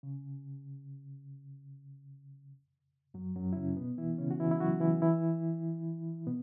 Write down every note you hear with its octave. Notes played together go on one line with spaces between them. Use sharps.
C#3
F#2 F#3
F#2 F#3
E4
C#3 C#4
B2 B3
E3 E4
C#3 C#4
F#4
E3 E4
E4
F#3 F#4
E3 E4
E3 E4
B2 B3